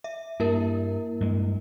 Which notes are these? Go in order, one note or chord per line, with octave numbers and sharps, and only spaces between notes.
E5
G2 A#3 E4 A#4
G2 G#3